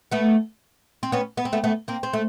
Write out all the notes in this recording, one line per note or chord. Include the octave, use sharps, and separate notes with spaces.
A3 B3
C4
B3 C#4
B3
C4
A3 B3
A3 B3
A#3 C4
C4
A3